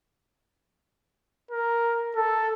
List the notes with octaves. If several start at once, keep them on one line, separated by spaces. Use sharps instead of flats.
A#4
A4